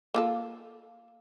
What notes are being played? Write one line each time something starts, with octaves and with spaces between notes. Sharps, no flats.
A#3 F4 A4